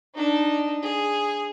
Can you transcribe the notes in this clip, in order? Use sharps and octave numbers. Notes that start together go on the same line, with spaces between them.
D4 D#4
G#4